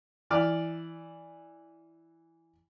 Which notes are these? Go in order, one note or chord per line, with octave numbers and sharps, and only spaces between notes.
E3 D5 D6 F6